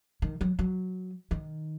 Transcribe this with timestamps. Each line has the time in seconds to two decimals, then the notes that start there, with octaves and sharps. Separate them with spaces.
0.22 D#3
0.41 F#3
0.59 F#3
1.31 D#3